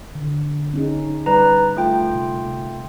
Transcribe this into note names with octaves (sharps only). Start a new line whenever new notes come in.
D3
C#4 D#4 G#4
G3 D#4 B4 D5 A#5
A3 F4 G5
C3